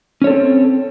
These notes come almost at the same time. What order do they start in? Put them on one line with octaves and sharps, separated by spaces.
C#4 C#5 A4 C4